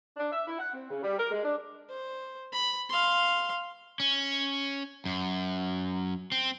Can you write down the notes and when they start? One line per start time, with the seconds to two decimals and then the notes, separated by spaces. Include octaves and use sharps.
0.16 D4
0.31 E5
0.46 E4
0.58 F#5
0.73 C4
0.90 C#3
1.02 G3
1.18 A#4
1.31 G#3
1.44 D4
1.89 C5
2.53 B5
2.89 F5 C6
4.00 C#4
5.05 F#2
6.32 C4